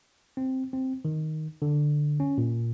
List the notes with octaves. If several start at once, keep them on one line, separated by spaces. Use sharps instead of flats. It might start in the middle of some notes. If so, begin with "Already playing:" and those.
C4
C4
D#3
D3
C#4
A#2